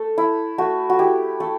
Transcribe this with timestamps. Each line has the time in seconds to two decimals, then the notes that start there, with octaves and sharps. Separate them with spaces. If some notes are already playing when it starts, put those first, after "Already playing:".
Already playing: A3 A4
0.18 E4
0.58 A3 F#4
0.90 F#4
0.99 E4 G4
1.40 A3 A4